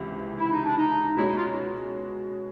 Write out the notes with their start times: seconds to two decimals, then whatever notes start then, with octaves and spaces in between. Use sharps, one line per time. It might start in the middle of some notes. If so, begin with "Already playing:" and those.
Already playing: C#2 C3 E3
0.37 E4
0.51 D#4
0.64 D4
0.77 D#4
1.17 B2 G#3 C#4 E4 F#4
1.26 D#4
1.37 F4